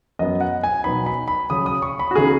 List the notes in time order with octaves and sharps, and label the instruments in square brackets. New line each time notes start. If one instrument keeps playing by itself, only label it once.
[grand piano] F#2 F#3 B3 D#5
F#5
G#5
B2 F#3 B3 D#4 B5
B5
B5
C#3 F#3 C#4 D#6
D#6
C#6
B5
F#4
C#3 B3 D#4 G#4